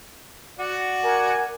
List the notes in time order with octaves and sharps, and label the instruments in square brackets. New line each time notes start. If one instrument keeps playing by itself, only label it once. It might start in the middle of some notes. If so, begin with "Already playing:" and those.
[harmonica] F#4 D5 F#5
[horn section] A#4 G#5